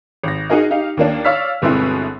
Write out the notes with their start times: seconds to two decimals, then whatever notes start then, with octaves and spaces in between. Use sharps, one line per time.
0.24 G#1 A#6
0.50 D#4 F#4 G#4 A#4 D#5
0.71 D#4 G4 F5
0.97 D#2 A#3 D4
1.24 C#5 D5 F5 E6 F6 B6
1.62 G1 B2 G#3 C4 E4 G#4